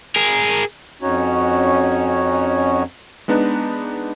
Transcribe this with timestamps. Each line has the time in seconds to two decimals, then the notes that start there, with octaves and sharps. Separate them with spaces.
0.16 G#4 A#4
1.02 F2 C#4 D#4 F#4 C#5
3.28 G#3 B3 D4 D#4 B4